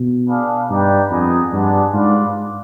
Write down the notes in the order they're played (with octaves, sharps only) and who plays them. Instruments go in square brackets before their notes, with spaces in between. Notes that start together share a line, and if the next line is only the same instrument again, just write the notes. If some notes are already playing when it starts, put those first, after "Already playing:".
Already playing: [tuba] B2
[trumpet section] D4 G#4 B4 F5
[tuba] G2 [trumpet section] D#4 B4 D5 G5
[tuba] F2 [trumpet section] B3 D#4 G#4
[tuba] G2 [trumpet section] G#3 B3 D4
[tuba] G#2 [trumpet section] F4 B4 D5